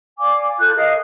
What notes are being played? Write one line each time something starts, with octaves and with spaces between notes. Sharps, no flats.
D5 F5 G#5 D6
F4 A4 F#6 G6
G#4 A#4 D#5 F5